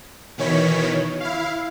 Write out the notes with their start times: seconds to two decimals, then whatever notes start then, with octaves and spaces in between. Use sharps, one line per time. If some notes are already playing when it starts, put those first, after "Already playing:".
0.38 B2 D#3 E3 C#5 B6
1.20 E4 F5